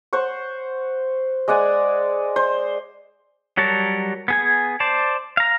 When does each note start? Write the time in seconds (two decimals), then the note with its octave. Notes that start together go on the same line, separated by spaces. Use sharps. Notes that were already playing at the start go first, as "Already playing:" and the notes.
0.13 C5 F#5 C#6
1.48 G#3 D5 F#5 G#5
2.36 C5
3.57 F#3 G3 A#4 C#5 A5
4.28 B3 G#4 G#5
4.80 C5 D5 A5
5.37 F5 A#5